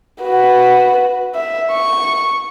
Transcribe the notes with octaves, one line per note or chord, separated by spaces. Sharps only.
F#4 B4
E5
C#6